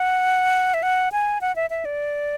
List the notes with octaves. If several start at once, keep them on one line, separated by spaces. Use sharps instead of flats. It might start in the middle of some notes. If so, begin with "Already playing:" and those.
Already playing: F#5
E5
F#5
G#5
F#5
E5
E5
D5